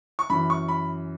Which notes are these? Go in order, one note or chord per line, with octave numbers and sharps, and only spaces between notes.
C#6
F#2 E3 B5
C#6
B5